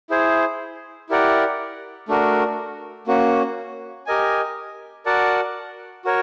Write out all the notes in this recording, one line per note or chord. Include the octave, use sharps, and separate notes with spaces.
E4 G#4 C5
E4 G4 A#4 D5 F#5
A3 D4 F#4 A#4
A#3 C#4 F#4
G4 A#4 D#5 G#5
F#4 A#4 D5 F#5 A5
F#4 A#4 C#5